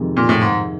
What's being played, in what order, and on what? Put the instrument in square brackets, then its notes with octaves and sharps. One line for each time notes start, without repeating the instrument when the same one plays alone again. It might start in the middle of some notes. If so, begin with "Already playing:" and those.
Already playing: [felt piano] F2 C3 D#3 G#3
[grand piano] A#2
A2
G#2